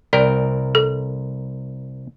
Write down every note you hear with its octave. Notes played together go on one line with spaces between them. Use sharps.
C2 A#4 D5 G5
A4